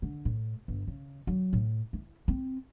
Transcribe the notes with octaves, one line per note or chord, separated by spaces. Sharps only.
D3
A2
G1
C#3
F#3
A2
E4
C4